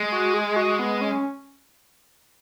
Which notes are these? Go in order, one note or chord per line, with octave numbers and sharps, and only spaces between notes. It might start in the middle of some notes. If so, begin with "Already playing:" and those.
Already playing: G#3
F#4
G#4
F#4
B3
C#4